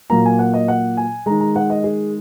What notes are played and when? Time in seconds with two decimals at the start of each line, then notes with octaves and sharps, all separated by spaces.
0.10 A#2 F#3 A#3 A#5
0.25 G#5
0.39 F#5
0.54 D#5
0.68 F#5
0.97 G#5
1.26 D#3 G#3 A#5
1.41 A#5
1.56 F#5
1.70 D#5
1.84 G#4